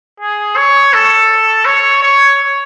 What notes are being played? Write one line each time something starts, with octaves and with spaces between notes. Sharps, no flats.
G#4
C#5
A4
C#5
C#5